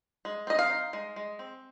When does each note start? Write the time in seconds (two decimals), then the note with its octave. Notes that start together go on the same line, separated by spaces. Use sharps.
0.25 G#3
0.47 C4 D#5
0.59 F5
0.70 D#4
0.93 G#3
1.16 G#3
1.39 C4